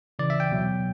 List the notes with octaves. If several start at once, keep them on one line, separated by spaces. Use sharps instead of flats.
C#3 E3 D5
E5
G5
B2 F#3